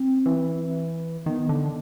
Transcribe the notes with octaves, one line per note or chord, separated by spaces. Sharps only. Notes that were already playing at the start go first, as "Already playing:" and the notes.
Already playing: C4
E3
D#3 B3
D3